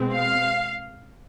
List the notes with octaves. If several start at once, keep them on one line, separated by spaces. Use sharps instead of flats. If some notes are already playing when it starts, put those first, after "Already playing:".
Already playing: B2 G#3 C4
F5